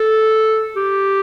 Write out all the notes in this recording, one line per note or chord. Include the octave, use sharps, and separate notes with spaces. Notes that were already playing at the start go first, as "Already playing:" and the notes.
Already playing: A4
G4